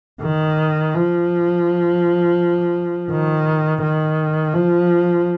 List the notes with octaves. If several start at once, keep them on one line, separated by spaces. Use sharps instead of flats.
D#3
F3
D#3
D#3
F3